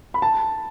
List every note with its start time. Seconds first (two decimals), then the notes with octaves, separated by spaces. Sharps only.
0.14 B5
0.22 A5